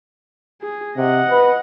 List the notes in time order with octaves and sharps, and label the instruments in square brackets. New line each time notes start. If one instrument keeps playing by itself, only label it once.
[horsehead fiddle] G#4
[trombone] C3 [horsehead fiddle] D#5 F#5
[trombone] B4